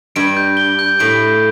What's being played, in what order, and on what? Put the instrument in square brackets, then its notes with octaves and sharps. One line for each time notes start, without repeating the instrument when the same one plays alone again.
[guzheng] G2 [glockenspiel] D7
[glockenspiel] G6
G7
G6
[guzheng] A2 [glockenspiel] D7
[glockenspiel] G6